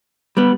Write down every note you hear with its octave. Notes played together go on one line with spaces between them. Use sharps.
G3 B3